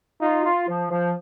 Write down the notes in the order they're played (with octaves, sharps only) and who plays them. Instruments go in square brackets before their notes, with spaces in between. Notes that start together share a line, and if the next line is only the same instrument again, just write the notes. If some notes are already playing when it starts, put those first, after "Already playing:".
[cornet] D#4 [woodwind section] F4
[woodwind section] F4
F3
F3